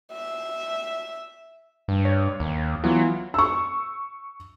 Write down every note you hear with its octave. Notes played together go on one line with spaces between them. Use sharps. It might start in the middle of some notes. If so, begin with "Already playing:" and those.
E5
G2
C#5
D#2
E3 F#3 B3 F4
C#6 E6